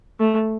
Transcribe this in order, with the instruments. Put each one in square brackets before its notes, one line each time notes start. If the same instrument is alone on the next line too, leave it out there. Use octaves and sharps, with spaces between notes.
[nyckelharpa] A3